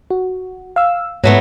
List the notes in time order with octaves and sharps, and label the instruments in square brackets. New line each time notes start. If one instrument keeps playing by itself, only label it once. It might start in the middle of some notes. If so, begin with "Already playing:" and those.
[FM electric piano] F#4
F5 E6
[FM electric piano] G#2 [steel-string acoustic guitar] F#3 A3 B3